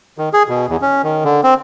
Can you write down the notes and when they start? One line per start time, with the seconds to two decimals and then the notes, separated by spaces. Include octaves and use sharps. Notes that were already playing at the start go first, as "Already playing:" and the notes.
0.18 D#3
0.33 G#4
0.49 B2
0.69 E2
0.82 C#4
1.03 D#3
1.24 D3
1.43 C4